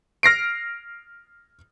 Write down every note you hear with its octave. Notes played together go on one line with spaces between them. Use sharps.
F6 A#6 C7 D7